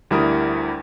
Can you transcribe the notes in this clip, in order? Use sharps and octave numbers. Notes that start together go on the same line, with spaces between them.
D2 G3 E4 A#4 D#6